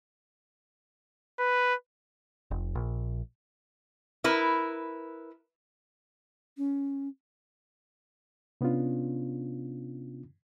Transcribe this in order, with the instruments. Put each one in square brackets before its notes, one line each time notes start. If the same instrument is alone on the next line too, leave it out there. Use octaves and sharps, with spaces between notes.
[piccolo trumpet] B4
[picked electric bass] F1
A#1
[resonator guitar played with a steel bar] E4 A#4 B4
[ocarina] C#4
[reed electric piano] C3 B3 C#4 D4 F4